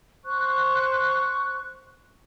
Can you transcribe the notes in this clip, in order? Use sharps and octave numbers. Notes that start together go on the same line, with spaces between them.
C5 C#6 F#6